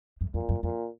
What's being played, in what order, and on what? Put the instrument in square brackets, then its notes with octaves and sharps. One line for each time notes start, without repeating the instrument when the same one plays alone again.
[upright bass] F#2
[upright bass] F2 [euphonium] A#2
[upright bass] F#2
[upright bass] F2 [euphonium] A#2